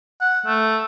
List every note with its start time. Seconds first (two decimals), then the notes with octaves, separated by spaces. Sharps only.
0.21 F#5
0.46 A3